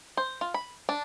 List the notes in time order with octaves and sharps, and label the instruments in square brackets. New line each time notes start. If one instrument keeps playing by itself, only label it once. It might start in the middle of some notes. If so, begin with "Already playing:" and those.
[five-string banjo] C5
F4
B5
D4